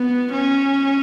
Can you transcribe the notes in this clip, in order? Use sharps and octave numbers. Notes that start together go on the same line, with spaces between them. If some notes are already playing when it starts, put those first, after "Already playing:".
Already playing: B3
C#4